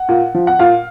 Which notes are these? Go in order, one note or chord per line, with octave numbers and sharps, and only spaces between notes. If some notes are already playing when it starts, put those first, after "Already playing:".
Already playing: F#5
A#2
F3
F#5
A#2 F5